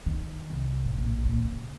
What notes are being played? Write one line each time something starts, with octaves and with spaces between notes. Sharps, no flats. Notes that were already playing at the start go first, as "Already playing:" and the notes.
D#3
C2
A2
A#1
A#2
C#3